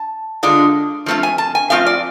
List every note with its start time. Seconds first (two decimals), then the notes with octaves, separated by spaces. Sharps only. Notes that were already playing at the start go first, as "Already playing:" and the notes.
Already playing: A5
0.43 D3 G#3 D4 F4
1.06 F3 A3 C4 F4
1.23 G#5
1.38 A5
1.55 G#5
1.70 F3 A3 C4 F4 F5
1.86 D5